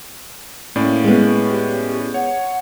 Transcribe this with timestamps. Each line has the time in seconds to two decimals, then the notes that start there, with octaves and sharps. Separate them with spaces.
0.76 A2 A#3 C#4 D5
1.04 G#3 B3
1.50 G4
2.14 C#5 F#5